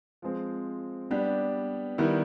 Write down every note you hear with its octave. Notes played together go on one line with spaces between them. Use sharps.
F3 G#3 C4
G3 B3 D4 G4
D#3 G3 B3 E4